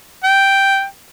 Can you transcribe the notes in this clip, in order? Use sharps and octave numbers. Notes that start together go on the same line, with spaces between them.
G5